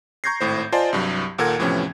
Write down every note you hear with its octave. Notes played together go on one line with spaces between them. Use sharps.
A#5 C#6 G6 G#6 A#6 C7
G#1 A2 C5
F4 C5 D5 D#5 G#5 A5
C2 G2 F#3
D#2 A#2 A4 A#4 F#5 G#6
E2 A2 C3 F3 B3 C#4